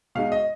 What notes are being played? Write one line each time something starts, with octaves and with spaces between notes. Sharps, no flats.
B2 G#3 D#4 F5
D#5